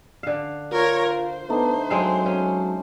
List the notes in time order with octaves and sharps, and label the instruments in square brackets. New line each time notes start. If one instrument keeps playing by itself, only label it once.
[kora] D3 F5
[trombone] F4 [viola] A#4 C#5
[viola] C5
[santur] A3 D4 D#4 [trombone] B3
[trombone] F#3 [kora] G#3 C4 F5
[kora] C#4